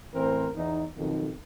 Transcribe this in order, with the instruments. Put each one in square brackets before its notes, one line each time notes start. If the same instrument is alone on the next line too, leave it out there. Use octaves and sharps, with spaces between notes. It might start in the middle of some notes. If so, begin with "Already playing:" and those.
[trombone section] A1 A2 E3 C4 A#4 C5
E2 D#4
B1 F2 D#3